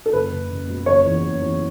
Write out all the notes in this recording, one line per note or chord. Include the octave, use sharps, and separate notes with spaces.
A4
F#1 B4
F#1
F#1
B2
F#1 C#5
E2
F#1
E2